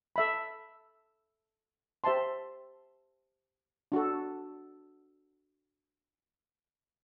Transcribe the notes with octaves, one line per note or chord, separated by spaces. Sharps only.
A4 E5 B5
G4 C5 E5 A5 C6
D4 F#4 A4